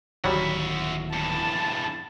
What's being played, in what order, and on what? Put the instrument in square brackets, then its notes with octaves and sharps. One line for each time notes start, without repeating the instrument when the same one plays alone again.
[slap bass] D1 D#2 [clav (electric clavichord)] F#3 G3 [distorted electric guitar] F#4 E5
[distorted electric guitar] E2 G2 [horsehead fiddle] A5